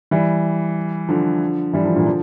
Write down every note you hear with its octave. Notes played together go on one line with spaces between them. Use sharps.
E3 G3
D3 F3
E3 G3
D3 F3
A#2 D3
D3 F3